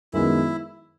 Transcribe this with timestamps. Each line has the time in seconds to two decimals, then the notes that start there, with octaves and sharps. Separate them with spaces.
0.13 F#2 D#3 G#3 B3 E4